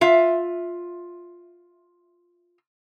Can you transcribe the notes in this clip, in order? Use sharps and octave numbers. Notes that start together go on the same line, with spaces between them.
F4 E5